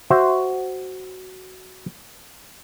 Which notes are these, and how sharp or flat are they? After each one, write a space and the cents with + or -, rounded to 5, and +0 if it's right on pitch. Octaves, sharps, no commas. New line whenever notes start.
F#4 +10 C5 +0 E5 +0